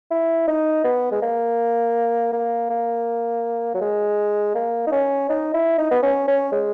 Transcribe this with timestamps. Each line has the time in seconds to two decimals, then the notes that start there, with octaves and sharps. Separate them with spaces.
0.11 E4
0.47 D#4
0.84 B3
1.12 G#3
1.22 A#3
2.33 A#3
2.70 A#3
3.75 F#3
3.81 G#3
4.55 A#3
4.87 D#4
4.92 C#4
5.29 D#4
5.54 E4
5.78 D#4
5.91 B3
6.02 C#4
6.28 C#4
6.52 G#3